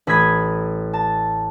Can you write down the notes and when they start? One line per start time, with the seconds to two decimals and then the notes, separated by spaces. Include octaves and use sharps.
0.07 A1 B5 D#6 G#6 B6
0.93 A5